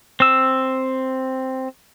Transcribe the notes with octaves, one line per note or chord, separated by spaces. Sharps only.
C4 E6